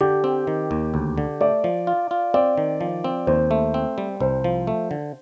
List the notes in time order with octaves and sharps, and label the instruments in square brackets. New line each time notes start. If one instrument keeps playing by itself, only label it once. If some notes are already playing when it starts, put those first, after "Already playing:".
[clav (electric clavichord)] D3 [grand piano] G4
[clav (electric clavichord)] C4
D#3
D#2
D2
D3
[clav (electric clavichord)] A3 [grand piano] D5
[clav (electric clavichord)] F3
F4
F4
[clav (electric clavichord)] C4 [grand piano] D5
[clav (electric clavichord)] D#3
F3
C4
[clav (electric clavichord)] D#2 [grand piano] C5
[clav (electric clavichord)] A3
C4
G3
[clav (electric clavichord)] C2 [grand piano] C5
[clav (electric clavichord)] F3
A3
D3